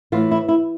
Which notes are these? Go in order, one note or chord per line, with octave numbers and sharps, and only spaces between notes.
A2 E3 F4
E4
E4